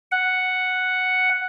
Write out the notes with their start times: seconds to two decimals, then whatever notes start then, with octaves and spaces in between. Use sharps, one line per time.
0.12 F#5